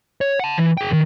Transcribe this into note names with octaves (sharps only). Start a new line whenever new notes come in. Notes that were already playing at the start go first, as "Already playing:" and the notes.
C#5
F#5 A5
E3
G#4 G5
D2 D#3